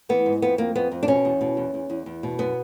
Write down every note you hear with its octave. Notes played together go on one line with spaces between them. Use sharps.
E3 B3
G#2
F2 B3
F2 A#3
F2 B3
F2
D4
B2 C#4
E2
B2
E2
E2
E2
E2
B2
F#2 B3